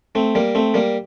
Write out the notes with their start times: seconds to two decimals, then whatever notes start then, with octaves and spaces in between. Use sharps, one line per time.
0.15 A3 C4
0.35 G3 A#3
0.55 A3 C4
0.74 G3 A#3